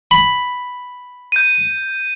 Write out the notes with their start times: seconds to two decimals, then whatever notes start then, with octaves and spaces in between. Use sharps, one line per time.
0.11 B5
1.32 G6 D#7